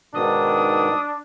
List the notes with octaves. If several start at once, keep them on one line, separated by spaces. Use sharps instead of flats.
G#2 B2 D#3 D4 D#6